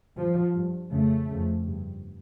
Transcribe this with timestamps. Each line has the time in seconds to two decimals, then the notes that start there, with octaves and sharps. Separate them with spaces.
0.16 G2 F3
0.54 G2
0.91 F2 C#3 A3
1.28 F2 C#3
1.65 G2